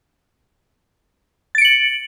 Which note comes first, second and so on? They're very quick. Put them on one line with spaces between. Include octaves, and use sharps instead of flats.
A6 D7 C#7 F#7